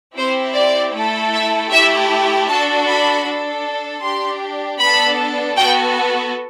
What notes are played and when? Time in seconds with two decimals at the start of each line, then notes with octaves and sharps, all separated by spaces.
0.17 C4 E4 G4 C5
0.56 D5
0.94 A3 E4 A4
1.33 E5
1.72 A3 E4 G4 E5
2.49 D4 F#4 A4 A5
2.87 B5
3.25 D4 A4
4.03 D4 G4 C6
4.80 B3 D4 A4 B5
5.57 B3 F#4 A4 G5